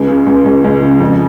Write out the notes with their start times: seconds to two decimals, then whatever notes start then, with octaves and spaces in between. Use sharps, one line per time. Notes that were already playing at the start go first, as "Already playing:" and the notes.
Already playing: C#2
0.08 C#3
0.26 C#2
0.45 C#2
0.64 C#2
0.82 C#3
1.00 F2